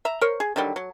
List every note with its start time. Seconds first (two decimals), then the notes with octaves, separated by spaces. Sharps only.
0.05 E5 A#5
0.21 A#4 C5 C#5
0.40 G#4
0.56 D3 D#3 F#3 G3
0.76 F#3